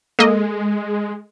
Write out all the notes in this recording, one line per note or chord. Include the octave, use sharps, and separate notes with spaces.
G#3 A#3 A4 D#5